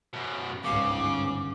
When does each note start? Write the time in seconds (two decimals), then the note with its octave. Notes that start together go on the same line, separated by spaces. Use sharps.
0.13 F#2 B2
0.64 G1 C#2 G#2 C#3 D6